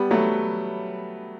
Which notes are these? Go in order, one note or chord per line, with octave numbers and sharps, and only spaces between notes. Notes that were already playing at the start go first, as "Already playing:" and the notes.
Already playing: G3 B3
F#3 A3